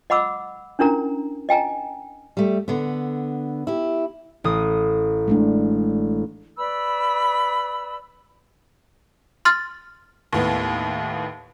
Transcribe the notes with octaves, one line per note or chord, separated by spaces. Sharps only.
D#5 F#5 B5 D6 E6
C#4 D4 E4 A#4 A#5
D#5 G5 G#5 A#5
G3 A3
D3 B3
E4 G4
A1 D#6
G#3 A3 D4
B4 D5 B5 E6
C6 F6 A6
D#2 A2 B3